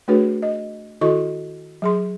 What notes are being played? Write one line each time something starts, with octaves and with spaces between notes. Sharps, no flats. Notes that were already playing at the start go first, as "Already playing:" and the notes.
A3 D4 F#4 G#4 B4 C#5
D#5
D#3 E4 F#4 A4 D#5 C#6
F#3 G#4 C6